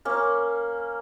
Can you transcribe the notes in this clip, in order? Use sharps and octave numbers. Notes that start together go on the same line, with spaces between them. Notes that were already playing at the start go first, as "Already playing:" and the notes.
A#3 C#4